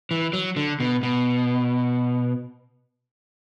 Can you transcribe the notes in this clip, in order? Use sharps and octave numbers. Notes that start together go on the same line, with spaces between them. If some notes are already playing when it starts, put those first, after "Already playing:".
E3
F#3
D3
B2
B2